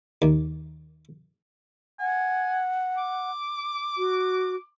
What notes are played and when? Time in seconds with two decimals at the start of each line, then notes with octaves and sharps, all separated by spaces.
0.22 D#2
1.99 F#5 G#5
2.98 D6
3.98 F#4